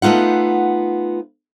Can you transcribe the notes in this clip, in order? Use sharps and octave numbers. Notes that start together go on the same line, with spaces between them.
A3 B3 D#4 F4 F#5